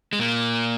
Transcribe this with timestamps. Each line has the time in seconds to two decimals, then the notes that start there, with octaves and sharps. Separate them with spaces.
0.13 G#3
0.19 A#2 A#3